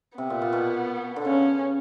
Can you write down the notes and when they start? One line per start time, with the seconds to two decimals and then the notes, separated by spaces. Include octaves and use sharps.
0.18 C3 B3
0.30 A#2
0.42 A#2
0.53 B2
1.16 D3
1.24 C#3 C#4